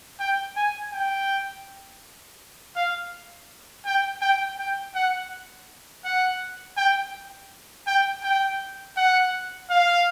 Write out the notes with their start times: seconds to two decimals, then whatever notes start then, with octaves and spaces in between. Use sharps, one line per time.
0.20 G5
0.57 G#5
0.93 G5
2.76 F5
3.86 G5
4.22 G5
4.59 G5
4.95 F#5
6.05 F#5
6.77 G5
7.87 G5
8.23 G5
8.97 F#5
9.70 F5